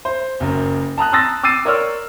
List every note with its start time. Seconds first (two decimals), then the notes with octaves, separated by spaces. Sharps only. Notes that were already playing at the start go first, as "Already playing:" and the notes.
0.05 C5
0.40 F#1 F#2
0.98 A5 A#5 D#6 F#6
1.12 C6 D#6 E6 A6 A#6
1.43 D6 E6 A6 C7 D#7
1.65 A#4 C#5 D5 C6 E6 F6